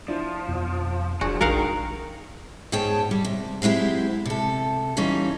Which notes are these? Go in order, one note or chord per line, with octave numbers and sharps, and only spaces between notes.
F3 D4 E4
F2 B2
E1 F3 F#3 D4 F#4 G#4 G#5
A#1 D#3 D4 G#4 A#4 F5 F#5
G#2 B2 G#4 C#5 G5 A5
G3
C3
F#3 G#3 C4 E4 G4
C3 A4
E3 G3 C#4 D#4 F4